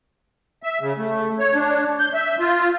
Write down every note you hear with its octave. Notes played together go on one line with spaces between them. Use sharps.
E5
C#3
A3
C#5
D4
G6
E5
F4